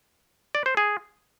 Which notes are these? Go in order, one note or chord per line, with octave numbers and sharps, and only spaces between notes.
D5
C5
G#4